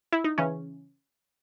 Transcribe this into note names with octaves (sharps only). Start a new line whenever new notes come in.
E4
D#4
C#3 E3 C#4